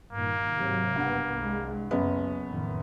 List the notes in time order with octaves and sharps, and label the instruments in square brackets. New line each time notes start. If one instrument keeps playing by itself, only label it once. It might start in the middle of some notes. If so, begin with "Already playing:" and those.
[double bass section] G2 A#2 D#3 [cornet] A#3
[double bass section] G#2 C3 F#3
[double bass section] F#1 B3 [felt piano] G2 F#5
[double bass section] C2 G#3
[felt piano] F#1 B3 C#4 [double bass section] F#2
[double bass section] F2 A2 D#3